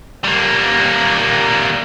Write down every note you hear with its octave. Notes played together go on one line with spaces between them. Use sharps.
G3 A#3